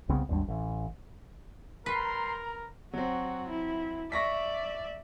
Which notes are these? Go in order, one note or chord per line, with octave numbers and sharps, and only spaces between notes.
C2 C#3 B3 C4
G#1 D#2 G3 D4
A1
G3 A#4 B4 A#5 C6
F#3 C4 F#4
E4
D5 E5 C#6 A#6 B6